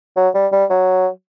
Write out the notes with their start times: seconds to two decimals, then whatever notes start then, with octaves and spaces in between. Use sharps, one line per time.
0.17 F#3
0.35 G3
0.52 G3
0.70 F#3